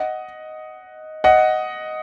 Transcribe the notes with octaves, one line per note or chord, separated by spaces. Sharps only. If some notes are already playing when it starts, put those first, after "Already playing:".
Already playing: D#5 F#5
D#5 F#5